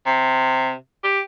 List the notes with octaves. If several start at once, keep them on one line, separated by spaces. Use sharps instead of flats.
C3
G4